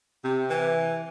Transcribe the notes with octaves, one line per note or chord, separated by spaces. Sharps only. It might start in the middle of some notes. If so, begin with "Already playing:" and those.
C3
E3